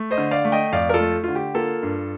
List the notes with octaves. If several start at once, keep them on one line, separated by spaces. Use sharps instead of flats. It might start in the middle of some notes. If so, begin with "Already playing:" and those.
Already playing: A3
C5 D#5
D3
D5 F5
A3
D#5 G5
F2 D5 F5
A#4
F4 A4
A3
D3 F4
G4
A#3 F4 A4
G2